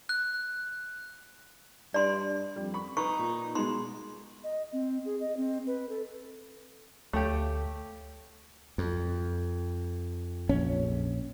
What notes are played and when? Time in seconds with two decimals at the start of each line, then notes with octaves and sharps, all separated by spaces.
0.09 F#6
1.94 G2 D5 C6
2.56 F2 G3
2.74 B5 C#6
2.97 D#4 B4 C#6
3.19 A#2
3.55 B2 G#3 D#4 C6
4.44 D#5
4.73 C4
5.05 G#4
5.20 D#5
5.37 C4
5.67 B4
5.89 A4
7.13 D2 A3 G4 C#5 F5 G5
8.78 F2
10.49 A#1 C#4